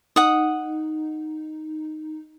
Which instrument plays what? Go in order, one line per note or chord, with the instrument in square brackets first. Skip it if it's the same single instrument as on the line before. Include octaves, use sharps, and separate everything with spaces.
[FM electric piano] D#4 [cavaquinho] F#5 D#6